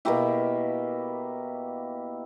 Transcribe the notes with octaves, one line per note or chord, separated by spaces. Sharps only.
B2 A#3 E4 G4